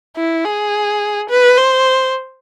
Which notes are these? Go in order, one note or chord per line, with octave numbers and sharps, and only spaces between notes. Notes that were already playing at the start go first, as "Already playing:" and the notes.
E4
G#4
B4
C5